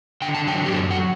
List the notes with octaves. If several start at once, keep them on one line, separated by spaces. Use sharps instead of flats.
D3 G5
A5
F#3 G5
G4
F#2 A4
F#5